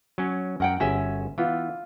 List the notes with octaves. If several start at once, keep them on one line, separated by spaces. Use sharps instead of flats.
F#3 C#4
F#2 A#4 F#5 G5
G1 C#4 F#4 G#4 E5
E3 B3 F4